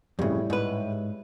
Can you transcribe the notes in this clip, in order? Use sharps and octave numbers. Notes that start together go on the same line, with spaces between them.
F2 A2 C#3 G3
G#2 B4